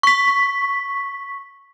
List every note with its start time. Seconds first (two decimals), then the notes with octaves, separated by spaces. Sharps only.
0.03 C#6 B6